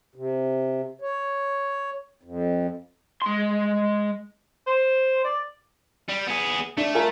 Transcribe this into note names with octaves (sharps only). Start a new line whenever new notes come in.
C3
C#5
F2
G#3 C6
C5
D5
G3
B3 G#4
A3 D4
F4 A#4 G#5